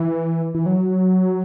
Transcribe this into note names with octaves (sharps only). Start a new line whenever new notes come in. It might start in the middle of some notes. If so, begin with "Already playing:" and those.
Already playing: E3
E3
F#3